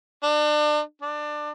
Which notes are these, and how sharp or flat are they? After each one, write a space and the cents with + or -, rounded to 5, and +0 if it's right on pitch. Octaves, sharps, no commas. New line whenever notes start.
D4 +35
D4 +20